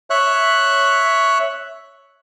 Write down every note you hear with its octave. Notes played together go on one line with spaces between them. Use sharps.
C#5 E5 F#6